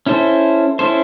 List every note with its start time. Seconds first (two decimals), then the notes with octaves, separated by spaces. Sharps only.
0.06 C#4 E4 A4 C5
0.79 C#4 E4 A4 C5